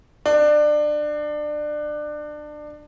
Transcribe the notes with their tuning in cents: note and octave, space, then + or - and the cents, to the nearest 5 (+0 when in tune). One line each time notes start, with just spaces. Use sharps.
D4 +25